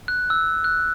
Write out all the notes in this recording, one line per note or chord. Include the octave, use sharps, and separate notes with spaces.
F#6
E6
F#6